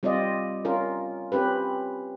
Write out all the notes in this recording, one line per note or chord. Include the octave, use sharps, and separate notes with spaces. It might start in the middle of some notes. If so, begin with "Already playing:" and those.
G3 C4 F4 D5 D#5
C#4 F4 A#4
C4 C#4 G4 B4